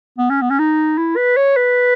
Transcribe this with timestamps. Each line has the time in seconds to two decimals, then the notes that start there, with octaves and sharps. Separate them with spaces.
0.18 B3
0.30 C#4
0.42 B3
0.50 C#4
0.59 D#4
0.98 E4
1.17 B4
1.37 C#5
1.57 B4